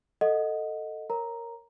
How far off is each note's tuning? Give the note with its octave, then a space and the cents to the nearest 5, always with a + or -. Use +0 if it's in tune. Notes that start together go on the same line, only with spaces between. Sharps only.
A4 +10 D#5 +0 F#5 -15
A#4 -5 C#5 -15 A#5 +0